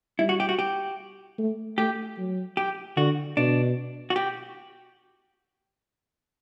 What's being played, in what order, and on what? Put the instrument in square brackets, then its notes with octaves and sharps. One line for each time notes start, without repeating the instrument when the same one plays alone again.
[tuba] G3 [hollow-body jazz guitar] E4
[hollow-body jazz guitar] F#4
G4
F#4
G4
[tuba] A3
[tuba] A3 [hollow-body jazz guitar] G4
[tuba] F#3
[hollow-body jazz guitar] G4
[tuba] D3 [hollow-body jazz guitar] F#4
[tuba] B2 [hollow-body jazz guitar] D4
[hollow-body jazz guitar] F#4
G4